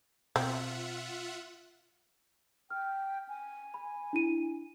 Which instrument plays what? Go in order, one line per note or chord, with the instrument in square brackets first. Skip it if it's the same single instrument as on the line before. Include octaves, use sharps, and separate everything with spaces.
[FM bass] B2 [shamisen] C4 [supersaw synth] F4 E5 F#5
[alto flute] G5 [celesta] F6
[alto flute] G#5
[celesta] B5
D4 E4 D#7